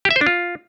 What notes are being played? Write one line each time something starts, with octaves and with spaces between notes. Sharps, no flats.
G4
E5
C5
D4
F4